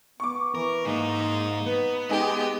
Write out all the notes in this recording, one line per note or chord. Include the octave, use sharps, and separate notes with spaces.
B3 C#6 D6
E3 A#4
G#2 G#3 A#3 D#4
B3 B4
G#3 D#4 G4 G#4 G5